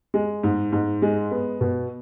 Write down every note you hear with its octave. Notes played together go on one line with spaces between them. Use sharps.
G#3
G#2
G#2
G#3
B3
B2